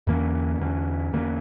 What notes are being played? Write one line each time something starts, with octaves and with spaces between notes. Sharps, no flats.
E2 D3 A#3 C#4
E2 D3 A#3 C#4
E2 D3 A#3 C#4